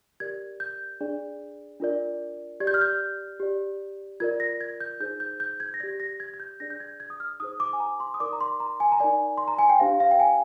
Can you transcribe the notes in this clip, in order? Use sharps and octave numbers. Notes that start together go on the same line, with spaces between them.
G4 A#4 D5 G#6
G6
D4 G#4 D5
D4 F4 A#4 D5
G4 D5 G#6
G6
F6
G6
G4 D5
F4 A#4 D5 G#6
A#6
G#6
G6
D#4 G#4 C5 G6
G6
G6
G#6
A#6
G4 D5 G#6
A#6
G#6
G#6
G6
D4 G#4 D5 A#6
G6
G#6
G#6
D#6
F6
D#4 G#4 C5 D#6
D6
G#5
A#5
C6
D#6
D#4 A#4 D5 D6
A#5
C6
A#5
G#5
A#5
D#4 A#4 D5 G#5
C6
A#5
G#5
G5
D4 G4 C5 F5
F5
G5
G#5